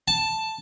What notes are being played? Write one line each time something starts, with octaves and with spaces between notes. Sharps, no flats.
A5